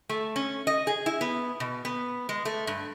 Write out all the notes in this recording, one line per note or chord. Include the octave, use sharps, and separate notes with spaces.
A3
C#4
D#5
G#4
E4
B3
B2
B3
G#3
A3
G2